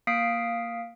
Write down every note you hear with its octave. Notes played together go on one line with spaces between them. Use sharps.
A#3 F5 D#6 B6 C7 D7